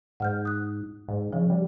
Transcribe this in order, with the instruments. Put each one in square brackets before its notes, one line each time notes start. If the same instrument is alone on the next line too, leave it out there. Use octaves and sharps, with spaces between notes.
[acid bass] G#2 [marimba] F#5 F6 G6
[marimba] D#6 F#6
[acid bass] G#2
[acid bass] C#3 [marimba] F3
[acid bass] G3